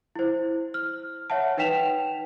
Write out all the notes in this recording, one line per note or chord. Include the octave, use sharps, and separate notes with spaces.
E4 C5
F6
C#5 E5 F#5 A5
D#4 B4 G5 B6 E7 F7